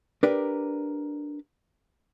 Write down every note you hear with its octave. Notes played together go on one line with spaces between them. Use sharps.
D4 G4 A#4 B4 D5